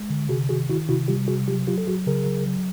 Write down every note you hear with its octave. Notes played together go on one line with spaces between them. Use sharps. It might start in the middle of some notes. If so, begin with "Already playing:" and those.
Already playing: G#3
D3
C3 F#4 G#4
D#3 F#4 G#4
D#3 E4 F#4
C3 E4 F#4
G3 F4 G4
C3 F#4 G#4
F#3 F4 G4
F#3 F4 G4
A4
F#3 F#4 G#4
C#3 G#4 A#4
F#3
F#3